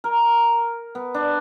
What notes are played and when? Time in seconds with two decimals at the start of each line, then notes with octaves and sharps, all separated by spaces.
0.04 A#4
0.95 B3
1.14 D4